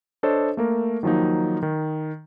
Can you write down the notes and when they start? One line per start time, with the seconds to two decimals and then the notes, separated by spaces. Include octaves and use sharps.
0.23 D4 A4 C5 C#5 D#5
0.57 A3 A#3 A#4
1.03 D#3 F3 F#3 A#3 D#4
1.63 D#3